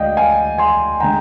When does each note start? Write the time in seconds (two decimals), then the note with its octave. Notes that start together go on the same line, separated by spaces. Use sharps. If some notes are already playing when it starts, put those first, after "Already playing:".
Already playing: D2 D3 G#3 D5 D#5 F5 G5
0.17 F5 G#5
0.58 G#5 C6
1.00 D3 G#3 G5 A#5